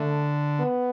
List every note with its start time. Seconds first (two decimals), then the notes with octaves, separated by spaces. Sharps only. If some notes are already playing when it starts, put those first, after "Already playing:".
Already playing: D3 A3
0.59 B3